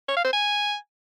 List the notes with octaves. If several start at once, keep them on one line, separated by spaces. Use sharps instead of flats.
C#5
F5
C5
G#5